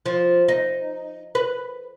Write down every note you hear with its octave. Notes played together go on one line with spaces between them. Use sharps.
F3
D#4
B4